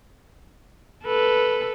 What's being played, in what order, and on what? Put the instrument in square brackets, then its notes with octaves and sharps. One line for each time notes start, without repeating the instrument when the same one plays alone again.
[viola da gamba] A4 B4